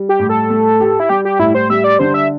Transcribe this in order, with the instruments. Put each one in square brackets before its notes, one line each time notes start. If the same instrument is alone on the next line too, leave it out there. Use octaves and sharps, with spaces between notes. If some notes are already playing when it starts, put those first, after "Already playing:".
Already playing: [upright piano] G3
[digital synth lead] G4
[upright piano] A2
[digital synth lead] A4
[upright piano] A3
G4
[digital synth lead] E4
[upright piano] G3 [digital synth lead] G4
[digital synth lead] G4
[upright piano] A2 [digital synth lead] E4
[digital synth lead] C5
[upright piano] G3 [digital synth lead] E5
[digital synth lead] D5
[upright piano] D3 [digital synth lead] C5
[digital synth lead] E5